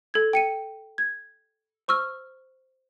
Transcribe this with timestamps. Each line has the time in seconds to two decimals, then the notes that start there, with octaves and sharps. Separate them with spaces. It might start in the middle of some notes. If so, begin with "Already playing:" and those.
0.14 A4 G#6
0.33 G5 C#7 D#7
0.98 G#6
1.88 C5 C#6 E6 F6